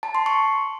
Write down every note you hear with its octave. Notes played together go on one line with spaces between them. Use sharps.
A5
C6
C#6